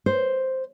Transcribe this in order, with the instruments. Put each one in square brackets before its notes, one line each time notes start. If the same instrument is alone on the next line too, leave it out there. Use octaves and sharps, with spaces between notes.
[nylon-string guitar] C5